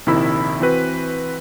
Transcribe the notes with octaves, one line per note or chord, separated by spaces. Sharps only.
A#1 C3 D#3 E4 B5 E6
E3 C4 F#4 B4